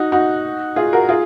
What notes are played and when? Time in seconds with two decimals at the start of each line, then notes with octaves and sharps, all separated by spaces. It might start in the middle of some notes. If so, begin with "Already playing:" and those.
Already playing: D#4 F#4
0.12 D#4 F#4
0.76 F4 G#4
0.93 F#4 A#4
1.09 F4 G#4